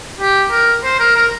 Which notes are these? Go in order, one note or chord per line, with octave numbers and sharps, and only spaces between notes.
G4
A#4
C5
A#4
A#4